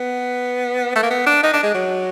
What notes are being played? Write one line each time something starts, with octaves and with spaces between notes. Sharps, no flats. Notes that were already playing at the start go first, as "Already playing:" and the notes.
Already playing: B3
A3
A#3
B3
D4
D#4
D4
G#3
F#3